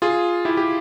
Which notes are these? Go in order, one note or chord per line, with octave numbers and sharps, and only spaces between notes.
F4 G#4
E4 G4
G4